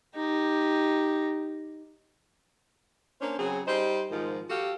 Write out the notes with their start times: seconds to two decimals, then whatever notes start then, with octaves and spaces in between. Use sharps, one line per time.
0.16 D#4 G4
3.21 A#3 C#4 D4 C5
3.38 C#3 F#3 C4 G#4
3.66 G3 D#4 C5
4.10 G#2 D#3 F3
4.50 F#4 G4 A4 F5